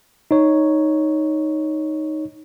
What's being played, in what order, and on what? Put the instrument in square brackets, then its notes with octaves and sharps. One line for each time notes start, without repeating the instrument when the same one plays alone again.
[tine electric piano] D#4 C#5